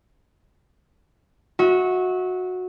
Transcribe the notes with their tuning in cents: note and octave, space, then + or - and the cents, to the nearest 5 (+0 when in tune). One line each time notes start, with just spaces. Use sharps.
F#4 -15 E5 -35